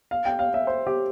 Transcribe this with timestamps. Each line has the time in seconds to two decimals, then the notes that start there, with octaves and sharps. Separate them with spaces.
0.11 F5
0.25 G5
0.39 F5
0.54 E5
0.67 C5
0.87 G4